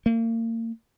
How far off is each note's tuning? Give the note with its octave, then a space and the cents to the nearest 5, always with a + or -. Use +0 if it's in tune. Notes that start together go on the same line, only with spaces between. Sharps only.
A#3 -35